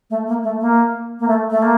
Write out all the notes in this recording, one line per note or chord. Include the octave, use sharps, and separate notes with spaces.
A3
A#3
A3
A#3
A#3
A3
A3
A#3